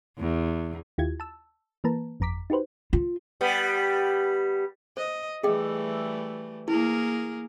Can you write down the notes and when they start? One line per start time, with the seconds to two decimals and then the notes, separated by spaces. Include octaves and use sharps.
0.19 E2
0.98 D#2 E4 F4 G4 G#6
1.20 A5 E6
1.84 E3 A#3 B4 A5 A#5
2.20 G1 F2 A#5 D6 B6
2.50 D#4 F#4 G4 B4 C5
2.93 F4
3.41 G3 B3
4.97 C5 D#5
5.43 E3 G3 A3 G#4 D#5 G5
6.68 A#3 E4 G#4 A#4